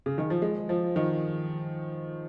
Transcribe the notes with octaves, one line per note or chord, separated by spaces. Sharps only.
C#3
D#3
F3
G#3
F3
D#3